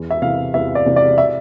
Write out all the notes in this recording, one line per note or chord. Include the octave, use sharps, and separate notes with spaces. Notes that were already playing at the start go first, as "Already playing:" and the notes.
Already playing: E2
E5
C3 E3 F5
E2 E5
D5
C3 E3
D5
E5